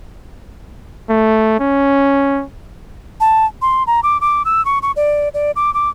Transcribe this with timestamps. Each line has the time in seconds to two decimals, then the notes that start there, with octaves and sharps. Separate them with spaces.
1.09 A3
1.59 C#4
3.20 A5
3.62 C6
3.87 A#5
4.03 D6
4.21 D6
4.45 E6
4.65 C#6
4.82 C#6
4.96 D5
5.34 D5
5.56 D6
5.74 D6